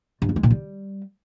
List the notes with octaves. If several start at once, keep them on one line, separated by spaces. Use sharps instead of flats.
G2
E2
G#3
A#2
G3